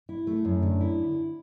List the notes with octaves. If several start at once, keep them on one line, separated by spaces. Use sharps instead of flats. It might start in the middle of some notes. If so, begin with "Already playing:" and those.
E4
A3
F#2
D3
E4